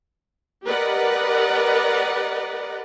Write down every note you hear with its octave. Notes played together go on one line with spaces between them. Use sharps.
G4 A#4 B4 D5 D#5 F#5